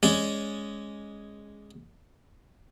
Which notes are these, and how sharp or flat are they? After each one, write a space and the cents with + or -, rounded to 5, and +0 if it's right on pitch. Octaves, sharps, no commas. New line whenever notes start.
G#3 +0 C#4 -5 D5 -15